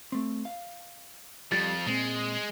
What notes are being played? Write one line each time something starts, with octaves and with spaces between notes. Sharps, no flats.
A3 C4
F5
F2 G3 F4 A6
A#2 G#3 C4